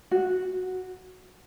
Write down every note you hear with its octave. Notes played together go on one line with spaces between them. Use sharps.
F#4